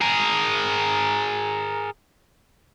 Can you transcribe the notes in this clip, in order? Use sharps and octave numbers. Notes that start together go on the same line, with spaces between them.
G#4 A#4